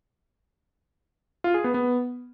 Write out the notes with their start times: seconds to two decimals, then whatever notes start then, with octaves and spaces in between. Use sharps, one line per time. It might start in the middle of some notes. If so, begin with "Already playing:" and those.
1.44 F4
1.54 G#4
1.64 B3
1.74 B3